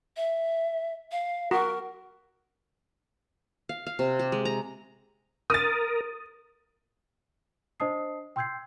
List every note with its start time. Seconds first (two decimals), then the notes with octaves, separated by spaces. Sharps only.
0.17 E5
1.12 F5
1.51 F#4 A#4
3.69 F5
3.86 F5
3.99 C3
4.19 G4
4.32 G#3
4.45 A#5
5.50 A#4 D#6 A6
7.80 D4 C5 D#5 A5 D#6 C7
8.36 G5 C6 E6 G6 G#6 C7